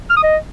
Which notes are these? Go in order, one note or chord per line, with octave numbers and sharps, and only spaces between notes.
F6
D#6
D#5